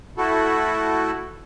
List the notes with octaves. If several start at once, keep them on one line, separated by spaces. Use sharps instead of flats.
A3 E4 F#4 A4